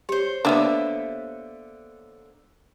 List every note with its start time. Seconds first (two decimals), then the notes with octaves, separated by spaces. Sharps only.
0.09 G4 C5 C#5
0.45 D3 A#3 B3 C#4 D4 E5